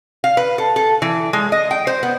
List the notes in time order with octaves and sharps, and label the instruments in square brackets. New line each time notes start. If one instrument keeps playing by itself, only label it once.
[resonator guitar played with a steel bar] F5
B4
A4
A4
E3
G#3
D#5
G5
C5
B3